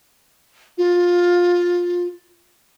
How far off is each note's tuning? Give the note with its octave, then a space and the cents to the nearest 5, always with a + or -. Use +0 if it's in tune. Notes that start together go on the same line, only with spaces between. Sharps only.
F4 +15